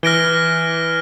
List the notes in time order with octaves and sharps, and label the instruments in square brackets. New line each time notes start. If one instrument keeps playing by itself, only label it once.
[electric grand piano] E3 [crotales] F6 A#6 D7 G7